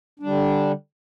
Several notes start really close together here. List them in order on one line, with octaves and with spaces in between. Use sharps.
D4 G3 D3